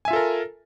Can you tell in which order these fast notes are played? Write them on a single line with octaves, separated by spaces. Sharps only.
G#5 E5 F4 A4 A#4